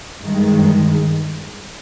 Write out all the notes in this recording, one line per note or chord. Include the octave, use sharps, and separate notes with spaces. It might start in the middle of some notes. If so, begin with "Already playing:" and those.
G2 D#3 G#3